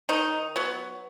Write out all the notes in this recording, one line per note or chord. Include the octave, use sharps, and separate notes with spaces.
D#3 D#4
F#3 B3